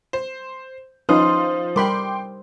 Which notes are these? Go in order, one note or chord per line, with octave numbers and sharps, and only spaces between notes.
C5
F3 C#4 D#4 B4 C5 D#6 F6
G3 A#4 G5 B5 C6 D6